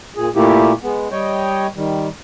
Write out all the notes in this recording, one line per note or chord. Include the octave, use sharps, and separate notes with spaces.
A#2 G#4
A#2 A3 A#3 E4 G4
G#3 B3
G3 C#5 D#5 G5
D#3 G3